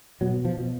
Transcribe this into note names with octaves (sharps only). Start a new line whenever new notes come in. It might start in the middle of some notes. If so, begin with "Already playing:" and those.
B2 F#3
F3
B2